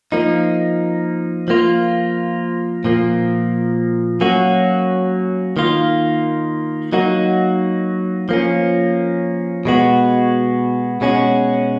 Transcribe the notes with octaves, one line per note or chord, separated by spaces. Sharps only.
F3 A#3 D#4
F3 A#3 F4
A#2 F3 A#3
F#3 A#3 C#4 F#4
D#3 A#3 F4
F#3 A#3 D#4 F#4
F3 A#3 C#4
B2 G#3 B3 F#4
B2 G#3 C#4 F#4